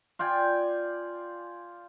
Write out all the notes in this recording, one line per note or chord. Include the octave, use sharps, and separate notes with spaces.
F4 D5 G5 G#5